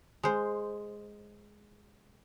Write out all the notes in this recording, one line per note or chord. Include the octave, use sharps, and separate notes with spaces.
G#3 C5